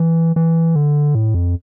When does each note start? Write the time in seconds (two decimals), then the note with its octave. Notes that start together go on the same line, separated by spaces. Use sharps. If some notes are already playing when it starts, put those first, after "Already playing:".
Already playing: E3
0.36 E3
0.76 D3
1.15 A2
1.34 F2